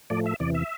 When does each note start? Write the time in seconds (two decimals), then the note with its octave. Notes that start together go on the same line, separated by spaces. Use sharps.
0.10 A2 F3 A3 D5
0.26 E5
0.40 E2 C3 E3 D5
0.54 E5